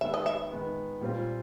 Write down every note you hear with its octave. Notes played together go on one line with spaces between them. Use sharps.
D#3 G#3 B3 E5
D#5
E5
D#3 G#3 B3
A#2 G3 C4 F4